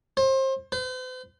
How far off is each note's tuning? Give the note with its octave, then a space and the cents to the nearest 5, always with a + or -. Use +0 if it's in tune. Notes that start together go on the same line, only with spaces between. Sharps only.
C5 +30
C5 -45